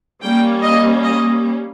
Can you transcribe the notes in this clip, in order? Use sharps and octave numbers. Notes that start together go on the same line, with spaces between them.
G3 A#3 C#4 G5
D#5
D#5